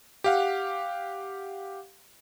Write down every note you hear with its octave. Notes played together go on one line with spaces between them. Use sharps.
G4 F5 F#5